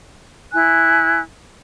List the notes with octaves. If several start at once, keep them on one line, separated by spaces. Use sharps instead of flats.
E4 G#5 F#6